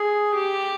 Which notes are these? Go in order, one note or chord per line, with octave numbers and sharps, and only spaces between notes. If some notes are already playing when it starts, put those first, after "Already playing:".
Already playing: G#4
G4